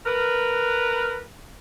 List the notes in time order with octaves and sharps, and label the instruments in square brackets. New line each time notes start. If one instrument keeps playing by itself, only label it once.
[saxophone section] A#4 B4